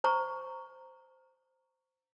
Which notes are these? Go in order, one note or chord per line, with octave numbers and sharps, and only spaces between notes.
C5 A#5 C#6